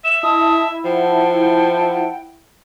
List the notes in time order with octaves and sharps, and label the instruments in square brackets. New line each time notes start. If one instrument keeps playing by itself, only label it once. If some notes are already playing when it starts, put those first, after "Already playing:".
[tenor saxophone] E5 [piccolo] E7
[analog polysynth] E4 [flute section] D#5 A5 [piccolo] D#6
[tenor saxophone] F3 [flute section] F#5 A5 [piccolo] G5